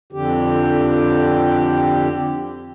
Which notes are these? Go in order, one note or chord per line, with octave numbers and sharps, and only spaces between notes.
F2 D3 G4